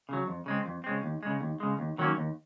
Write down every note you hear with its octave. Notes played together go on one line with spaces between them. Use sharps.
C#3 F#3
F2
C#3 G#3 C4
F2
C#3 G#3 C4
D#2
C#3 G#3
D#2
C#3 G#3
D#2
D#3 F#3 A#3 C#4
D#2